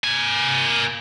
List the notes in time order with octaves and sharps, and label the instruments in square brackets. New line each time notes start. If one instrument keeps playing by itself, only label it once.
[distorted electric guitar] A#3 G#5